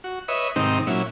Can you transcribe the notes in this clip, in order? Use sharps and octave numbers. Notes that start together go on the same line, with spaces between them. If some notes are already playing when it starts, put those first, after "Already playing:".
F#4
B4 C#5 D#5 E5
G#2 C3 D#3 C4 D#4
A#2 F#3 C#4 E4